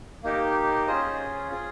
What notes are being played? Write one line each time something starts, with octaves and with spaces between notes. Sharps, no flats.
A#3 D#4 G4
C#4 F4 G#4 C5 D#5
C4 F4 G#4